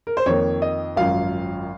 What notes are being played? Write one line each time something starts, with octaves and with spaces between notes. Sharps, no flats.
A#4
C5
F2 D#3 A#3 C#5
D#5
G#1 F#2 F3 F5